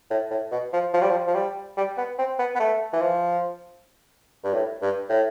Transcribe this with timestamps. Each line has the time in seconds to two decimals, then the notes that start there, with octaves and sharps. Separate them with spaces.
0.10 A2
0.31 A2
0.52 B2
0.73 F3
0.94 F3
1.02 G3
1.10 F3
1.27 F3
1.34 G3
1.77 G3
1.97 B3
2.19 C4
2.39 B3
2.55 B3
2.60 A3
2.93 E3
3.01 F3
4.44 G2
4.54 A2
4.82 G2
5.09 A2